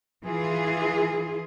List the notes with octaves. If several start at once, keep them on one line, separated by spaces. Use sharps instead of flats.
E3 F4 G#4